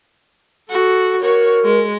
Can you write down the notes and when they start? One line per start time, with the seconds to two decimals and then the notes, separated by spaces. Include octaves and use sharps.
0.70 F#4 A4
1.21 F#4 A#4 C#5
1.64 G#3